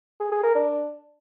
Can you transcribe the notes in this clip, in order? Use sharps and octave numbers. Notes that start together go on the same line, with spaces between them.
G#4
G#4
A#4
D4